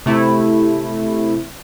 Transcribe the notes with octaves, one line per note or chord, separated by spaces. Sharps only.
C3 A3 E4